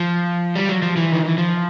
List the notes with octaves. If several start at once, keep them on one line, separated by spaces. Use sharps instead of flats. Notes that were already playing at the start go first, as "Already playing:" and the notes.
Already playing: F3
G3
F#3
F3
E3
D#3
E3
F3